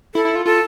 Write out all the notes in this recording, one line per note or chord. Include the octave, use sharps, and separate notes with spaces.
E4 A4
E4
F4
F4 A4